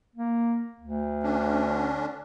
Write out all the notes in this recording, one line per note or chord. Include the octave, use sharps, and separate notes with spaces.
A#3
D2
D3 C#4 D4